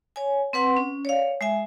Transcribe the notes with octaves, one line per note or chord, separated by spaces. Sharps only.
C#5 G#5
C4 B4 F#5 C6
C#4
C#5 D5 F5
G#3 E5 G#5